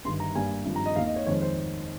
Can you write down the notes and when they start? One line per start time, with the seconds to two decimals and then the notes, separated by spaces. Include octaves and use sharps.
0.05 G1 G2 D#3 C6
0.20 A#5
0.35 G2 G3 A#3 G#5
0.65 G#1 G2 F3
0.76 A#5
0.86 D#5
0.96 D#2 D#3 A#3 F5
1.07 D#5
1.16 C#5
1.26 F2 D#3 G#3 C4 C#5
1.42 C5